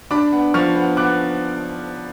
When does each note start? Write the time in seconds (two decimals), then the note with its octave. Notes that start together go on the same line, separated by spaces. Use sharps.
0.11 D4 B5 D6
0.32 B3
0.54 F3 C#6 F6
0.75 B3
0.97 B3 D6 F#6